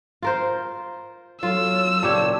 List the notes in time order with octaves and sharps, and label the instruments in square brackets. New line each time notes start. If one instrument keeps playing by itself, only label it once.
[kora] F4 A#4 C5
[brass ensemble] F#3 A4 C#5 [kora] F4 [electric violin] E6
[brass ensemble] F#1 D5 A5 [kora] A#2 G4 C#5